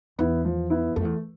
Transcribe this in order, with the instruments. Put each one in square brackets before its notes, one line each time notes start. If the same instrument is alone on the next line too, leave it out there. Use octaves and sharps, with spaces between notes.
[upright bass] E2 [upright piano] B3 E4
[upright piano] F3
B3 E4
[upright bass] F2 [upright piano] A3
[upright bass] E2